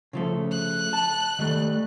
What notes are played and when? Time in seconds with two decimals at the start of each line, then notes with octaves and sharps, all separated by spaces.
0.13 C#3 F3 A3
0.52 F#6
0.93 A5
1.39 D#3 G3 A3